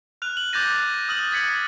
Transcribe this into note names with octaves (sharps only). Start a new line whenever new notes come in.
F6 F#6 F7
F#7
D6 F#6 G6 A6 A#6 D#7
D#6 F6 F#7
D#6 G#6 B6 C#7